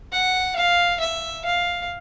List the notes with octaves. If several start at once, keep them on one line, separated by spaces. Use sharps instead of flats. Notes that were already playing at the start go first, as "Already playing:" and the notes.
F#5
F5
E5
F5